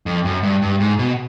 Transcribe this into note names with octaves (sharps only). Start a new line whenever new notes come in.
F2
F#2
G2
G2
G#2
B2